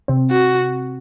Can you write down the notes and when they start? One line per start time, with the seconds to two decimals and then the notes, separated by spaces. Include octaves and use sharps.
0.08 C3 C4
0.31 F#4